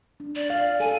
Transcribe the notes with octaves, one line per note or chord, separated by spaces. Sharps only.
D4
D5
F5
A4 G#5